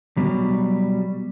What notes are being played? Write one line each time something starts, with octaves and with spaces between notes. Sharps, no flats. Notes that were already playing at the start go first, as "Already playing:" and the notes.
B2 F#3 G3